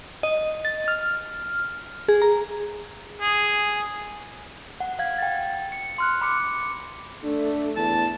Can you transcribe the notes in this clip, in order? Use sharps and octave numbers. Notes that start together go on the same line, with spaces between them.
D#5
A6
F6
G#4
A#5
G#4
F#5
F5 G#6
G5 A6
C#7
C6 F6 F#6
B5 D6 C#7
A3 D4
E2 A5